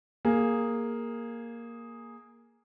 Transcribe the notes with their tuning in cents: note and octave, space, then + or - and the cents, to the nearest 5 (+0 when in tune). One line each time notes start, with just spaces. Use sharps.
A#3 +0 G#4 +0